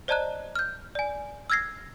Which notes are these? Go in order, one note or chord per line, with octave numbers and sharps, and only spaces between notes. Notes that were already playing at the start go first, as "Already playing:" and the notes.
C5 D5 D#5 A5 A#5 F#6
F6 G6
D5 G#5
E6 F6 G#6 A#6 C7